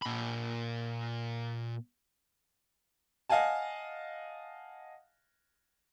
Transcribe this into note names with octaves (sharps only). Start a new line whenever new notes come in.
A#2 B5
D#5 F5 F#5 G#5 A5